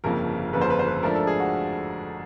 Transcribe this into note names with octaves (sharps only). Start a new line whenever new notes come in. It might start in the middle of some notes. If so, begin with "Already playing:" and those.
G1 F2 C#3 F3 A#3 A#4
G1 F2 C#3 F3 A#3 B4
C5
B4
C5
B4
G#2 F3 A3 D4 A#4
A4
G#4
F#4